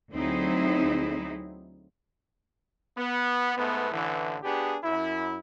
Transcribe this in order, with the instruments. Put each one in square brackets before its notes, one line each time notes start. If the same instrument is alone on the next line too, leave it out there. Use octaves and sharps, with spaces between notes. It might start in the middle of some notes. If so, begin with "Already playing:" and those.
[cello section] D2 F#3 C4 D#4 E4 G#4
[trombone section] B3
G#2 A3 B3
A1 D3 E3
B3 D4 G4 G#4
F#2 E4